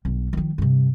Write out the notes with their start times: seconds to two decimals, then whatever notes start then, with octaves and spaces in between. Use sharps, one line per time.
0.05 B1 G2
0.33 D#3 F3
0.58 G2 C3